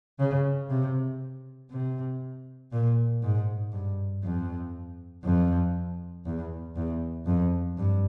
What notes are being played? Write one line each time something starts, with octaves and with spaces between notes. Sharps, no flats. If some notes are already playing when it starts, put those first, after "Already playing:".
C#3
C3
C3
A#2
G#2
G2
F2
F2
E2
E2
F2
G2